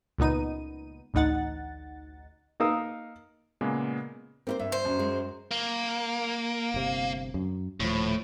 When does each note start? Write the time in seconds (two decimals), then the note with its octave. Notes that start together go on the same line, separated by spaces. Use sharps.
0.18 C#2 A#2 B3 D#4 D#7
1.14 A1 D2 D#4 F#5 A6
2.60 A#3 D#4 A#4 F5 D#6 E6
3.61 A#2 C#3 G#3 A#3 B3
4.47 A#3 C4 E4 C5
4.59 G2 E5
4.72 C5
4.85 F#2
4.99 G#3
5.51 A#3
6.74 G1 C3
7.34 F#2
7.80 D#1 A2 F3